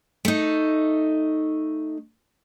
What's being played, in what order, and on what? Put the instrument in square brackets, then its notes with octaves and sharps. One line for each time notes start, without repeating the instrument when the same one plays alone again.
[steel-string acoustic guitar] A3 D#4